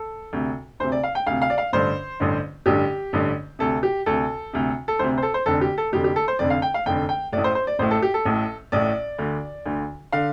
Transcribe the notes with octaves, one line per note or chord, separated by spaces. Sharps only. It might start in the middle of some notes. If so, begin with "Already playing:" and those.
Already playing: A4
D2 C3
D2 C3 C5
D5
F5
G5
D2 C3 F5
F5
D5
F5
A1 G2 D3 C5
A1 G2 D3
A1 G2 D3 G4
A1 G2 D3
D2 C3 A4
G4
D2 C3 A4
D2 C3
A4
D2 C3 C5
C5
A4
C5
F1 F2 D3 A4
G4
A4
F1 F2 D3 G4
G4
A4
C5
F1 F2 D3 D5
F5
G5
F5
F1 F2 D3 G5
G5
A1 A2 D5
C5
C5
D5
A1 A2 C5
A4
G4
A4
A1 A2
A1 A2 D5
D2 D3
D2 D3
D3 F5